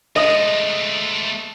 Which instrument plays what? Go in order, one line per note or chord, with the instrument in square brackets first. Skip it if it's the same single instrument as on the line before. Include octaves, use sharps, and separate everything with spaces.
[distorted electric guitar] G#3 A3 [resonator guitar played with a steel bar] D#5